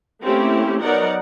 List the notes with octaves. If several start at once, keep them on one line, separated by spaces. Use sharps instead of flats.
A3 A#3 C4 C#4 E4 G4
F#3 B3 D#4 A#4 D5 F#5